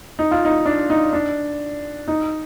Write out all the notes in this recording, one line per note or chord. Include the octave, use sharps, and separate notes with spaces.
D#4
F4
D#4
D4
D#4
D4
D#4